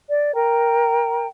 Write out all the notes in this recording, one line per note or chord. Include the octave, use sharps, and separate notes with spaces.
D5
A#4 G5 A#5